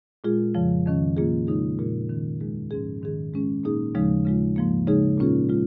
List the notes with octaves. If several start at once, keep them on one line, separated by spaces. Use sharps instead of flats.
A#2 G#3 F4 G#4
F2 C#3 F3
F2 D#3 C#4
A#2 A#3 F4 G#4
C#3 G#3 D#4 G#4
A#2 G#3 F4 G#4
G#2 D#3 C#4
D#2 D#3 G#3 D#4 G#4
G#2 F3 C#4 G#4
G#2 D#3 C#4 G#4
G#2 G#3 C#4 G#4
A#2 A#3 D#4 G#4
D#2 C#3 F3 G#3 D#4
C#3 G#3 F4
G#2 F3 A#3
C#3 G#3 D#4 G#4
A#2 A#3 C#4 F4 G#4
G#3 F4